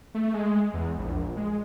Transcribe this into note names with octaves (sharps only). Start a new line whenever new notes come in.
A3
G#3
E2
A#1
G#3